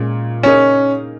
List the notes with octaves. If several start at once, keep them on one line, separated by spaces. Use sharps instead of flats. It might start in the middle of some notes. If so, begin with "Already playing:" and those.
Already playing: A#2 G#3 C#4
C#3 A#3 C#4 D#4 G#4